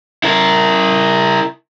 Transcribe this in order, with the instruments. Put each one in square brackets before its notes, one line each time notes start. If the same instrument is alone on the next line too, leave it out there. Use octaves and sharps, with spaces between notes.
[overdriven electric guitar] E4 A#4